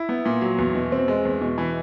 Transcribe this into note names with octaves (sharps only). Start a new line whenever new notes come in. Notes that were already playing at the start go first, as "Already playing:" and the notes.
Already playing: E4
B3
A#2
F#3
E2
B2
C4
G#3
E2
B2
E3